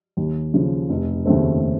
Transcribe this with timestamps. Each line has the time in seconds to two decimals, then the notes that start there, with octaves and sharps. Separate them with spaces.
0.17 D#2
0.54 C#3 F3
0.90 F1
1.26 D#2 C#3 A3 C4